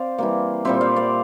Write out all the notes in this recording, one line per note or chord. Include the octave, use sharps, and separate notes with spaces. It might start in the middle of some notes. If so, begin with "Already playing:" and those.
Already playing: C4 C5 D5 F5
E3 G3 A#3
A#2 G3 C4 C5 E5
D5 F5
D5 F5